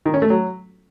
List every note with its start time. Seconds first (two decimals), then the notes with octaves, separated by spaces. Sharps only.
0.06 D#3
0.14 C#4
0.22 A3
0.30 F#3